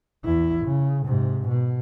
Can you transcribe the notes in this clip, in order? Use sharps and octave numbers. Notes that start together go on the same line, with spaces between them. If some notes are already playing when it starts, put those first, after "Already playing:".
E2 E4
C#3
G#2 C3
B2